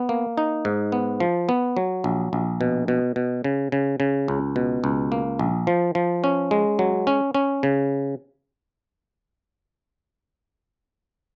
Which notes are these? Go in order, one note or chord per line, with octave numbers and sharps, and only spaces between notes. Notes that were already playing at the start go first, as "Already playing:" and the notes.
Already playing: B3
A#3
D#4
G#2
B3
F3
B3
F#3
A#1
A#1
B2
B2
B2
C#3
C#3
C#3
C#2
B2
C#2
A#3
A#1
F3
F3
C#4
G#3
F#3
C#4
C#4
C#3